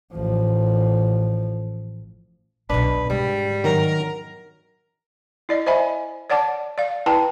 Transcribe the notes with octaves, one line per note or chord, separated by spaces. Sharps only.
A1 F3
B1 B2 D4 B4
G#2 G3
D#3 F#3 A#4
E4 D5 D#5
C5 D#5 E5 G#5 B5
C#5 D5 F#5 A5 D6
D5 F5
E4 B4 G5 A5 A#5